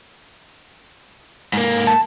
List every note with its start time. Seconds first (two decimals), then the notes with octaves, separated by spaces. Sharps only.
1.53 G#2 A#3
1.87 A5